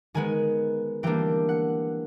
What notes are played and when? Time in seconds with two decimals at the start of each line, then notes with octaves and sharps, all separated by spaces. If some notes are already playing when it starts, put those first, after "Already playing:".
0.14 D#3 G#3 B3 G#5
1.03 E3 G3 A#3 D4 G5
1.49 F#5